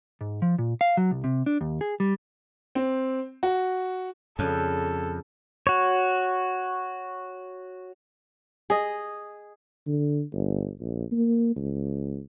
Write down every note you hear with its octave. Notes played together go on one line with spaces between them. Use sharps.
G#2
F3
A#2
F5
F#3
C2
C3
D4
D#2
G#4
G3
C4
F#4
F2 C#3 D4 A4
F#4 C#5
G#4 D#5
D3
G1
A#1
A#3
C#2